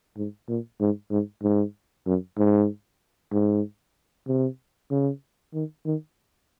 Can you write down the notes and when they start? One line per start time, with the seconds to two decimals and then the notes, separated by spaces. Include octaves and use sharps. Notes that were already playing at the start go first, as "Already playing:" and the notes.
0.17 G#2
0.49 A#2
0.80 G#2
1.11 G#2
1.43 G#2
2.06 F#2
2.38 G#2
3.33 G#2
4.27 C3
4.91 C#3
5.54 D#3
5.85 D#3